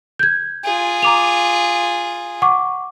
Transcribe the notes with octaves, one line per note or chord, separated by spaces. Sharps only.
G6 G#6
F4 G#4
A#5 D6 F7
F#5 C#6 D6